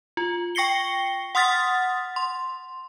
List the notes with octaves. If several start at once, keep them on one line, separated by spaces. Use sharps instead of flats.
F4
G5 C#6 A#6 C7 C#7 G7
F#5 C6 D#6 F6 A6 B6
C6